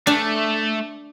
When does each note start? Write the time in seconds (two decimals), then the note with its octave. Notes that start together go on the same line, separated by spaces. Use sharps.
0.07 A3 D4